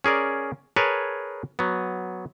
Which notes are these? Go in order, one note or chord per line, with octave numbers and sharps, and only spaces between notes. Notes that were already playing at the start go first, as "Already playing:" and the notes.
C#4 G#4 A#4 D5
G#4 A#4 B4 C#5 A5
F#3 B3